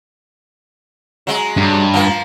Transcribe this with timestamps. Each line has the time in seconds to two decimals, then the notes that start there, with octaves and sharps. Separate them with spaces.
1.27 F#3 G#3
1.57 G2
1.94 F3 A#3